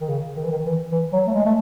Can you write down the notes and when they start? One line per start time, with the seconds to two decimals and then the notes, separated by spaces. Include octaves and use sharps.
0.01 D#3
0.09 C#3
0.36 D#3
0.44 E3
0.51 D#3
0.65 E3
0.92 E3
1.12 F#3
1.27 A3
1.34 G#3
1.45 A3